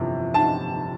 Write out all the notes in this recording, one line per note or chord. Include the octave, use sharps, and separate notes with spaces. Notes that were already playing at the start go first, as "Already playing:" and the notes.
Already playing: G1 F2 C3 E3
A5